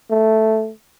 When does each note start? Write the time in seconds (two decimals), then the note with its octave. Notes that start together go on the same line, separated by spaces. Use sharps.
0.10 A3